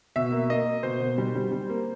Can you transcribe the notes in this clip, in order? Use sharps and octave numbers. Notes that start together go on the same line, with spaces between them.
B2 E5
A#3
A#3 D#5
A#3
B2 C5
B2
G3
G3
G3
A#3